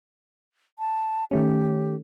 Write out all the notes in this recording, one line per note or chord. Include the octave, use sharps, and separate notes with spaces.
A5
D#3 A3 C#4 G4